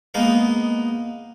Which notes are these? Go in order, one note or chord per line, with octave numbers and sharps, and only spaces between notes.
G#3 A#3 B3 D#4 F5